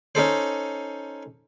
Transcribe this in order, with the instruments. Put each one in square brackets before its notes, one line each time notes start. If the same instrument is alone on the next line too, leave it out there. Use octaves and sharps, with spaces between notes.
[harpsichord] C#4 D#4 A4 C5